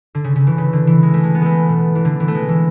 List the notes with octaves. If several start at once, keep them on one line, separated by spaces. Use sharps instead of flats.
D3
C#3
C#3
E3
C#3
D3
E3
G#3
A3
G#3
B3
G#3 A3
B2
E3
D3
E3
A3
G#3
E3